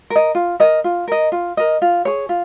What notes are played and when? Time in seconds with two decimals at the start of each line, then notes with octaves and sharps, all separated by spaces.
0.10 A#4
0.16 D#5
0.35 F4
0.60 A#4 D#5
0.84 F4
1.08 A#4 D#5
1.32 F4
1.57 A#4 D#5
1.82 F4
2.05 G#4 C#5
2.29 F4